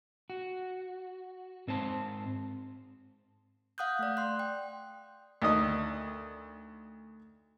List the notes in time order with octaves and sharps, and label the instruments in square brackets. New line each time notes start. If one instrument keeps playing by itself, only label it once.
[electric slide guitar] F#4
G#2 C4 C5 A5
[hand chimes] F5 F#5 D#6 F#6 G6
A3 D5
C6 F#6
G5
[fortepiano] D2 D#3 D5 D#5 D#6